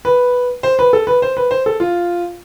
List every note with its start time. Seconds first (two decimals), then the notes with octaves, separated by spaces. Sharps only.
0.05 B4
0.63 C5
0.79 B4
0.93 A4
1.07 B4
1.22 C5
1.37 B4
1.51 C5
1.66 A4
1.80 F4